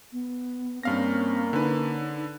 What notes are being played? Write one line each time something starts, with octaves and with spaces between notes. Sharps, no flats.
B3
G2 A#3 C4 C#4 F5 A#6
D3 D#4 B4